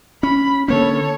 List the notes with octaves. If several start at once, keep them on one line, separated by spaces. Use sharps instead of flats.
C#4 B5
D3 A#3 C#4 A4 C#5